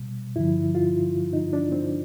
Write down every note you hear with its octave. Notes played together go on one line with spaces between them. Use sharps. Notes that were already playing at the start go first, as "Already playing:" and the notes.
Already playing: B2 G3
G2 D3 F3 E4
F4
D#4
D4
C4